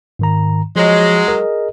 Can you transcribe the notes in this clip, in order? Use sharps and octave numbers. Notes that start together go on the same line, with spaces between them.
G#2 D#3 A#5
F3 F#3 G#3
G#4 A#4 D#5